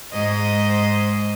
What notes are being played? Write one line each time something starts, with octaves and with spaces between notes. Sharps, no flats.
G#2 C5 D#5